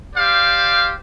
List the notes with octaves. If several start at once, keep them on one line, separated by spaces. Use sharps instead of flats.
G4 C5 D5 F5